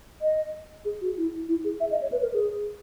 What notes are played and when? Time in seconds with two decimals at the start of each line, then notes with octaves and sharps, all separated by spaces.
0.22 D#5
0.85 G#4
1.01 F#4
1.17 E4
1.49 E4
1.64 G#4
1.80 E5
1.91 D#5
2.02 C#5
2.12 B4
2.22 A#4
2.33 G#4